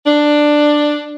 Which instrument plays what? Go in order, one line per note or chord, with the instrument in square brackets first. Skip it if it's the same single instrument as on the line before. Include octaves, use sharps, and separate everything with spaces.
[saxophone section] D4